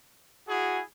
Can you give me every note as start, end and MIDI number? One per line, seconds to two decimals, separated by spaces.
0.49 0.83 64
0.49 0.81 66
0.49 0.83 68